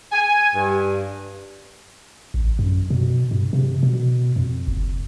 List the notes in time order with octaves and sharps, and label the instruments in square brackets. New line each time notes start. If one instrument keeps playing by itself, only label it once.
[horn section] G#5
G2
[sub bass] A1
F#2
B2
G2
C3
B2
F2
F#1